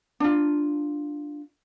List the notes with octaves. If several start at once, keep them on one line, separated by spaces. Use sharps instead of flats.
D4 F4